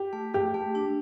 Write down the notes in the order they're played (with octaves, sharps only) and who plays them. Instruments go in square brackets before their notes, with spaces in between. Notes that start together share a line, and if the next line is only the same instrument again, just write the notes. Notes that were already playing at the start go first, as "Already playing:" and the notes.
Already playing: [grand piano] G4
[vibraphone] A3
[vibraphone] A3 [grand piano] G4
[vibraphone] A3
D4